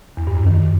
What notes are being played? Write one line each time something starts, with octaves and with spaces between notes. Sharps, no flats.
E2
G2
F#2
D#3